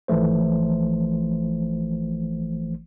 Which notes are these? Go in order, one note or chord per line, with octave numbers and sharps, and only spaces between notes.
G#1 E3 F3 A3 C5